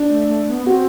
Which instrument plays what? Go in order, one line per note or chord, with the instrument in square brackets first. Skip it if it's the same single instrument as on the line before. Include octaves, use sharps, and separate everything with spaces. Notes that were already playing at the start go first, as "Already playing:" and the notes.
Already playing: [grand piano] D4
[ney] A3
A3
B3
[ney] C4 [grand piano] F#4